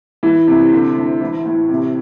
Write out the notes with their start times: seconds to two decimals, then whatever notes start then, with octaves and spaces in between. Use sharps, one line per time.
0.23 E3
0.47 C3
0.72 D3
0.96 D2
1.21 E3
1.46 A2
1.70 C3